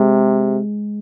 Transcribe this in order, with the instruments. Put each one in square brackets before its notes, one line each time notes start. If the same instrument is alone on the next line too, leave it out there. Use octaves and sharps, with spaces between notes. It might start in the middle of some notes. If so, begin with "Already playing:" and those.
Already playing: [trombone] C3 [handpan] G#3